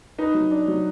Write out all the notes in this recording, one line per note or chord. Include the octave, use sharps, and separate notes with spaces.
D#4 B4
F#3
D4
F#3